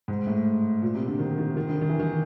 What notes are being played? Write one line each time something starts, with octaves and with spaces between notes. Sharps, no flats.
G#2
A2
A#2
C3
D3
D#3
D#3
D#3
D3
D#3
E3
D#3